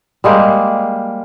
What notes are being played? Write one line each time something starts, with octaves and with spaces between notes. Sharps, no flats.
G3 G#3 A#3 G4